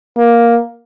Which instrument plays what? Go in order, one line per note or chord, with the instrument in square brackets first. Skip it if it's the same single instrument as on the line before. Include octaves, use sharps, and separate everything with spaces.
[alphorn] A#3